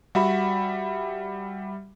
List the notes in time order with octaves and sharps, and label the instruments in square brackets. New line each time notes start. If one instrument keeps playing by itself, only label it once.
[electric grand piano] G3 E5 B5 [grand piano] F#4